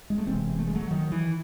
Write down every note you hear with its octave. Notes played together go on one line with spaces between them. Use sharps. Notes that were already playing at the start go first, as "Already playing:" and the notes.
G#3
A3
E1 E2 C3 G#3 C4
A3
G#3
F#3 A3
D#3 F#3
E3